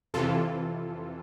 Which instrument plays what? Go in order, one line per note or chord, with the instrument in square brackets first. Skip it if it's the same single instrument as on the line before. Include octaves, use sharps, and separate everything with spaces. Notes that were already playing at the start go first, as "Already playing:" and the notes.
[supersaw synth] F2 C3 E3 F4 A4